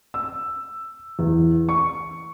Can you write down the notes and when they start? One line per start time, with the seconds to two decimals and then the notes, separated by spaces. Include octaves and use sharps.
0.14 E6
1.19 E2
1.69 C#6